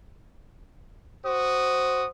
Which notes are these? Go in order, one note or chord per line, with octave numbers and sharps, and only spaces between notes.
F#4 C5 D#6